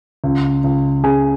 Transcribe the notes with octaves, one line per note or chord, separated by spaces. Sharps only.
C#2
C#2
C#3 G#4 G#5